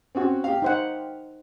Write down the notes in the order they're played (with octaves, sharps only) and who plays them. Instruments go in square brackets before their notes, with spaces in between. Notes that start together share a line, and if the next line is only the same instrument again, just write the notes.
[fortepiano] C4 C#4 F#4
G4 F5
[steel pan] D#4 C5 F#5